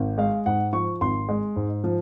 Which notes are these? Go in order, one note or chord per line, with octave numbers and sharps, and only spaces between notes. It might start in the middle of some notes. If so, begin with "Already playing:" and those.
Already playing: G#1
G#3 F5
G#2 F#5
F3 C#6
G#1 C6
G#3
G#2
F3